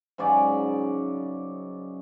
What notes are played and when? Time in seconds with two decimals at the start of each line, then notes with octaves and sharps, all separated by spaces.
0.18 G#2 C#3 F#3 D5